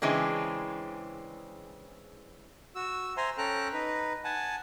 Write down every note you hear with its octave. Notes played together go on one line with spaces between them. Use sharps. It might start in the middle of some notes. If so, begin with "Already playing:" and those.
C#3 E3 G#3 C4 D4
F#4 E6
C5 E5 G#5 A#5 C6
C#4 A4 G5 A#5 F#6
D#4 B4
F#5 G#5 A5